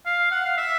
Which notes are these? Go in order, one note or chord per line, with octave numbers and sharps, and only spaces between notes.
F5
F#5
F5
E5